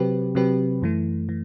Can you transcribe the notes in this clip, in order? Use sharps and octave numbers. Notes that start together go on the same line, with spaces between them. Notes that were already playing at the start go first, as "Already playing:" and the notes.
Already playing: C3 F#3 C4 G4 B4
C3 F#3 C4 G4 B4
F#2 E3 A3
E3